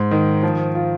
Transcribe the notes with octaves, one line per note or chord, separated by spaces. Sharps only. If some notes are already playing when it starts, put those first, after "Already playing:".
Already playing: G#2
D#3
F3
F4